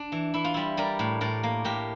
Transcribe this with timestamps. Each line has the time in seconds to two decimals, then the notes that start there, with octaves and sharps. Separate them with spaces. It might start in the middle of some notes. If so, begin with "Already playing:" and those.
Already playing: D4
0.12 E3
0.34 E3 E4
0.44 F4
0.54 G3 E4
0.77 G3 A#4 D5
0.99 A2
1.21 A2 A#4 D5
1.43 A#3
1.64 A2 G4 A#4